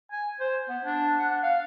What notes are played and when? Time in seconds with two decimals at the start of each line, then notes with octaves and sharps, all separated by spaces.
0.12 G#5
0.40 C5
0.69 B3
0.83 D4
1.19 F#5
1.43 F5